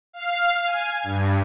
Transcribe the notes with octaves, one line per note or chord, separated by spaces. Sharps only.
F5
G#5
G2